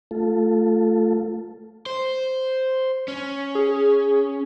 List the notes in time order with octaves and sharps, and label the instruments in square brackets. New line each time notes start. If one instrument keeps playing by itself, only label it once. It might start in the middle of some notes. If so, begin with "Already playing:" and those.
[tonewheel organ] A3 F4 A4
[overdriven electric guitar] C5
C#4
[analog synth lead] G#4